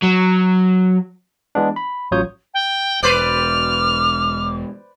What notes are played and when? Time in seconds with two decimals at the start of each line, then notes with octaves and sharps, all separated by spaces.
0.02 F#3
1.55 E3 G#3 B3 D4
1.76 B5
2.11 A1 F#3 F4 C#5 D#6 G6
2.54 G5
3.03 E1 B4 C5 D5 D6 F6